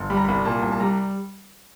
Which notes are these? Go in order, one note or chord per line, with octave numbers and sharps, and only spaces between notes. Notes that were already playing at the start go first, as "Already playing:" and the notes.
Already playing: G1
G3 B5
A#5
C2 B5
A#2 A5
C2
A5
G3 A#5